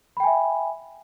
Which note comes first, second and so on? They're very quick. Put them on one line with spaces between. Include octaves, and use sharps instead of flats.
B5 G5 G#5 E5